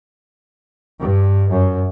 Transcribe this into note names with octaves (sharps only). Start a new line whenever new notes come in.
G2
F#2